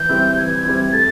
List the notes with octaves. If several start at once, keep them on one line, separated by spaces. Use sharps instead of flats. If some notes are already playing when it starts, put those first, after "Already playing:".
Already playing: E3 G6
G3 C4 E4
E3 G#6
G3 C4 E4
A3 A6